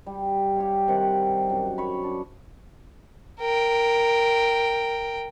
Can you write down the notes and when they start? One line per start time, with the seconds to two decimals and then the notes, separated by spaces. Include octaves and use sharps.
0.06 G3
0.56 G4 C#5 F5
0.88 C3 D#3 G3 F#5
1.50 F#2
1.78 C#5 B5
2.04 D4
3.40 A#4 G5